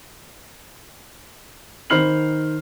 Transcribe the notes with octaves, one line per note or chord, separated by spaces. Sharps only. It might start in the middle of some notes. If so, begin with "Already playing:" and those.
D#3 C5 B5 F6 C7 F#7